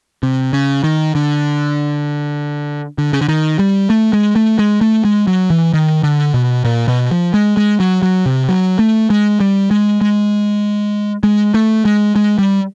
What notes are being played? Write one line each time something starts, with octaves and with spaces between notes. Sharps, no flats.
C3
C#3
D#3
D3
D3
C#3
D3
D#3
G3
A3
G#3
A3
G#3
A3
G#3
F#3
E3
D#3
D3
B2
A#2
B2
F3
G#3
G#3
F#3
F#3
C3
F#3
A3
G#3
G3
G#3
G#3
G#3
A3
G#3
G#3
G3